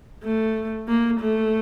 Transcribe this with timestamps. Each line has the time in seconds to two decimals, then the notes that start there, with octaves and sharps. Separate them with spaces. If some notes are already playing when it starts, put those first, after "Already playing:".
0.24 A3
0.88 A#3
1.20 A3